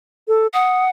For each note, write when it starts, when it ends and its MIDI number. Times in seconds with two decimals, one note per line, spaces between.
0.28 0.47 69
0.54 0.90 78
0.54 0.84 87